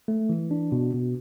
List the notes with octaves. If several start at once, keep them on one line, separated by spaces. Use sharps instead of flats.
A3
E3
D4
B2
B2